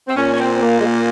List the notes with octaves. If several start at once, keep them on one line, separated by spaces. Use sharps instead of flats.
C4
A#2 C#4
C#4
C4
C4
A#3
G#3
A#3